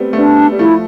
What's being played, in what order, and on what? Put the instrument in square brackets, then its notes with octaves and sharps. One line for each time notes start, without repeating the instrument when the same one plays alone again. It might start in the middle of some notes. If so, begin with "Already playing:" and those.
Already playing: [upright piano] G3 A3 B3 C4
A3
[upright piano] G3 B3 [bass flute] D4
[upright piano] G3
[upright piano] F3 A3 [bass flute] E4